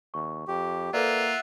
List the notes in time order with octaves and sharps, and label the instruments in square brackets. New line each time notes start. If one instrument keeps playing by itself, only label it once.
[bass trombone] D#2 [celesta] C#6
[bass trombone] F2 [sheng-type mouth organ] G4
[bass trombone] A#3 [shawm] F4 [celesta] A4 B4 D5 [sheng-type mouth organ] E5 F#5